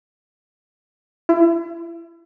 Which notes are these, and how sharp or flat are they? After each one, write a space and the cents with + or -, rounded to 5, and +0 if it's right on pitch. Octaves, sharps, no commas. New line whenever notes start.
E4 +35